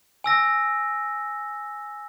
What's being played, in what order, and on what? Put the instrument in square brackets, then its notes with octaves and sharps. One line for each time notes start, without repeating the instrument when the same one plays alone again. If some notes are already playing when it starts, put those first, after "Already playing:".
[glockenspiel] G#5 E6 A#6